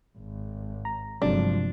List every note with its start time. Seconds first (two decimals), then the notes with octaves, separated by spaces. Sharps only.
0.17 G#1
0.85 A#5
1.22 G1 C3 F3 F#3 G#3 D4